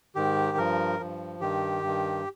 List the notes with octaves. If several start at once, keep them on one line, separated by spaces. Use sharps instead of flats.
G#2 D#3 G4
G2 F3 A#4
G2 F3
G2 D#3 G4
G2 D#3